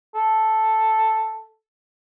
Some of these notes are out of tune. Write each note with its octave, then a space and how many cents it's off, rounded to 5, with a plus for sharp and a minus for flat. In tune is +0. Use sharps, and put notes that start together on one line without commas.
A4 +0